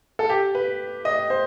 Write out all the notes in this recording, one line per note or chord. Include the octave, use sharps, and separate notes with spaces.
A4
G4
B4
D#5
C5